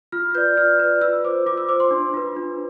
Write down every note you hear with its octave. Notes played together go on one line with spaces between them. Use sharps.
F4 F6
B4 D5 G6
F4 F6
B4 D5
F4 E6
C5 D6
F4 D6
E6
C5 D6
C6
D4
F4 B4
D4